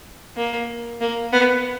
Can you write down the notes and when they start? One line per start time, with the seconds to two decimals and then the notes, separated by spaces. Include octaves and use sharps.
0.37 A#3
1.01 A#3
1.33 B3